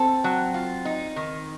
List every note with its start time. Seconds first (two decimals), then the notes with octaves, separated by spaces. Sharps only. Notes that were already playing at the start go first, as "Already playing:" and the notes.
Already playing: C4 A4
0.24 F#3
0.54 F4
0.85 D#4
1.16 D#3